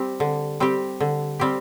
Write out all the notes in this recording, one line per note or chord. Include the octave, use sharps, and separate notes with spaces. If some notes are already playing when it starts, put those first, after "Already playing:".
Already playing: G3 C4 G4
D3
G3 C4 G4
D3
G3 C4 G4